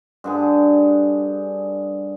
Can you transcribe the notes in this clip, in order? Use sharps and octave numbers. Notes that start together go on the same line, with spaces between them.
G2 D3 G#4